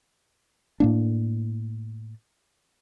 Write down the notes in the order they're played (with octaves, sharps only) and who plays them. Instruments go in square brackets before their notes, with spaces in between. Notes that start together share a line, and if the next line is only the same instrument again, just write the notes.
[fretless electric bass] A2 A#3 D4